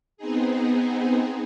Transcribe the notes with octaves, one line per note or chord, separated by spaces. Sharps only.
B3 C4 D#4 G#4